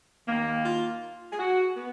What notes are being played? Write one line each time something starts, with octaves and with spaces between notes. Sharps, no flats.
D#2 D#3 A#3
F4
G#4
F#4
B3